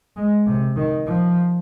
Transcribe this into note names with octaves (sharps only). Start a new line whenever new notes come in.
G#3
C3
D#3
F3